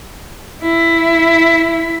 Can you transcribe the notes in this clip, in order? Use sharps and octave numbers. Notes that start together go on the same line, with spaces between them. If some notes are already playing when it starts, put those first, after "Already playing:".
E4